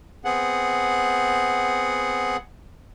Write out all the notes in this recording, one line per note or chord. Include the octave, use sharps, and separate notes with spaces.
B3 C4 G#4 F#5